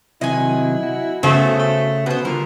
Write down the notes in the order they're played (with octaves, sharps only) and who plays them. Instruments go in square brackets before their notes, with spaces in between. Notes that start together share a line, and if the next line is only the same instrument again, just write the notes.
[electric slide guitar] C3 D#3 F#3 [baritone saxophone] E4 [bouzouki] D#5 G#5
[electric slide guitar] F#4
[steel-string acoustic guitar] C#3 [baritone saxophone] A3 [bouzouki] B3 C5
[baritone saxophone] A3
[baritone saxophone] B2 [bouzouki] B3 C5
[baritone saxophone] A#2 [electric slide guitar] D3 G3 [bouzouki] A#4